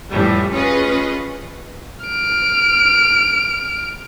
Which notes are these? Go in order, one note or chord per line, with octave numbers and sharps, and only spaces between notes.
F2 A2 E3 G3
C#4 F4 G#4 B4 D#5
F6 D7